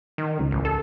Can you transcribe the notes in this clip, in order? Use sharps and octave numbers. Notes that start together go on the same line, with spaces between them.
D#3
C#2
A1
A4